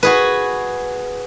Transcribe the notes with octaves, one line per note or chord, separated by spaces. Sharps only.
F#4 G#4 B4